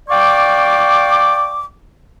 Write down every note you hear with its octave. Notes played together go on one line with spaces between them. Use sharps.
D5 F5 G5 C#6 D6